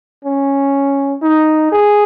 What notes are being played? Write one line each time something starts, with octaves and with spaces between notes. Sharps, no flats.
C#4
D#4
G#4